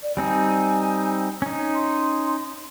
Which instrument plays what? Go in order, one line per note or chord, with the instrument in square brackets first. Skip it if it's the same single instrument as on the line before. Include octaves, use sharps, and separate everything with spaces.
[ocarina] D5
[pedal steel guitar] G3 C4 D#4 [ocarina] G#5
[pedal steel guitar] C#4 D#4
[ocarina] C6